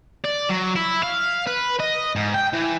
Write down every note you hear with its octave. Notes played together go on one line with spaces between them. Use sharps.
D5
F#3
E4
F5
B4
D#5
G#2
G5
E3